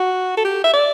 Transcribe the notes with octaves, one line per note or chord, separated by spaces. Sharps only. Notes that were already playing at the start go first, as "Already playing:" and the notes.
Already playing: F#4
A4
G4
E5
D5